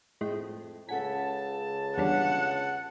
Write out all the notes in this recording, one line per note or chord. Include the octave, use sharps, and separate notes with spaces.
F2 A2 G#3 G5
C#2 C#3 A4 F#5 G#5 A5 B6
E2 D3 G3 C#5 F#5